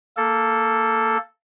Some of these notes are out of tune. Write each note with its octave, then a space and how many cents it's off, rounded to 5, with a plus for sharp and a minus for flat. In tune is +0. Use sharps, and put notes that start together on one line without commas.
A#3 -15 A4 +0